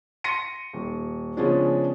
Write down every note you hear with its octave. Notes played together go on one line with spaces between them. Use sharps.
C6 A#6 C#7 D#7
D#1
C#3 F3 G#3 B3 C#4 D4